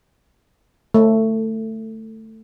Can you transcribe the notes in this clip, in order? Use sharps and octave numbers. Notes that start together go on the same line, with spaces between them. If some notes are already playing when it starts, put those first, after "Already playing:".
A3